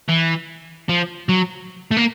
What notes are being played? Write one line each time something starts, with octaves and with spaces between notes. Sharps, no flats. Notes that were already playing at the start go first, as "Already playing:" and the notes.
E3
F3
F#3
A3
A#3